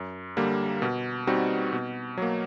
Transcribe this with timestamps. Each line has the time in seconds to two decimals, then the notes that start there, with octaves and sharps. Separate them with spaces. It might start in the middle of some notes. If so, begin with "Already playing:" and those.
Already playing: F#2
0.37 D3 G3 A#3
0.82 B2
1.27 G3 C4 D#4 F#4
1.73 B2
2.17 F#3 A#3